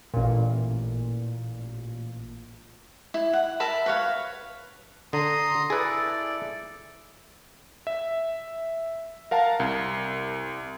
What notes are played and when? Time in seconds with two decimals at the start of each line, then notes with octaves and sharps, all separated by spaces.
0.14 A1 A#2
3.14 E4
3.33 F#5
3.60 A#4 E5 A5 B5
3.86 B4 C#5 F5
5.13 D3 A#5 C6 D#6
5.70 E4 G#4 A4 B4 D5
7.87 E5
9.31 A#4 F5 F#5 A5 A#5
9.60 C2